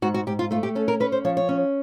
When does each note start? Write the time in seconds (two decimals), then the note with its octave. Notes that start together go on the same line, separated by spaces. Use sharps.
0.02 G#2 F#4
0.14 F#4
0.27 G#2 G4
0.39 F4
0.51 A3 F4
0.63 G4
0.75 C#4 A4
0.88 A#4
1.00 C#4 B4
1.12 C5
1.25 F3 C#5
1.37 C#5
1.49 C#4